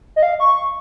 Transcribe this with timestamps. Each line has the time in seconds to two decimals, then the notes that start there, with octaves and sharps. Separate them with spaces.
0.16 D#5
0.23 F5
0.40 C#6